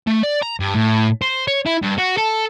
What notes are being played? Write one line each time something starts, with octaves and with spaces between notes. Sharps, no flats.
A3
D5
A#5
G2
A2
C5
C#5
E4
G2
F#4
A4